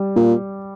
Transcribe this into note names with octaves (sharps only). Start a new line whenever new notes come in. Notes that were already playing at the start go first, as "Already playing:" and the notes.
Already playing: G3
A#2